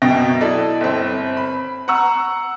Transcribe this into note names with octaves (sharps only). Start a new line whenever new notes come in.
F#2 B2 G5 A#6
E4 A4 D5 D#5
G1 C4
B5
F#5 A#5 C#6 E6